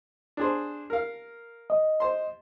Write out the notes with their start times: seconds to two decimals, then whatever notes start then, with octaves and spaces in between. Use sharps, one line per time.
0.37 D4 G#4 C5
0.90 A#4 F5
1.70 D#5
2.00 C5 C6